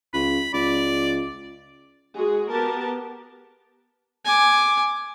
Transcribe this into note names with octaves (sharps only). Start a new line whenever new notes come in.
C#2 B5
C#2 D5
G#3 F#4 G#4
B3 G4 A#4 A5
G#5 D6